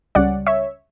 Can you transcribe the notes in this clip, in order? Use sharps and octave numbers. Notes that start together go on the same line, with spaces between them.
C#2 C#3 G3 C#4 D5 F#5
C#5 E5